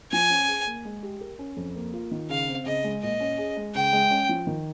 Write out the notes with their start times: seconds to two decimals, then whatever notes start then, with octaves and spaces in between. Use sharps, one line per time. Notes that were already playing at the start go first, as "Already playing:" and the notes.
0.12 F3 G#5
0.30 C#4
0.48 G#4
0.67 A#3
0.85 G#3
1.03 G4
1.21 A#4
1.39 C#4
1.57 F2
1.75 A#3
1.93 F4
2.11 D#3
2.29 C#3 F5
2.48 C4
2.66 C#3 D#5
2.84 G#3
3.02 A#2 D#5
3.20 C#4
3.38 G#4
3.57 G#3
3.75 C#3 G5
3.93 G#3
4.11 C#4
4.29 F3
4.47 D#3